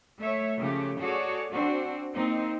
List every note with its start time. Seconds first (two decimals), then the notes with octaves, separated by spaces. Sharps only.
0.20 A3 C#5 E5
0.58 C#3 F3 A3 G4
1.01 F#4 G#4 A4 C#5 D5
1.51 C4 D4 F#4
2.13 A#3 C4 D#4